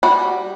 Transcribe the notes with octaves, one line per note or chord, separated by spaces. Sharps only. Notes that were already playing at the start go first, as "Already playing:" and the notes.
G3 F#4